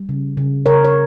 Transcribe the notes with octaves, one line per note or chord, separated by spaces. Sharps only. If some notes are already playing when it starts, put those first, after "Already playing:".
Already playing: G3
C#3
C#3
C#3 A#4 C#5
C#5